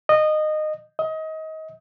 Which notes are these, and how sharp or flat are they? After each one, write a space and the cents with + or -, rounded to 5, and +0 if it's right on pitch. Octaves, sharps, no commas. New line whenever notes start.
D#5 -20
D#5 +25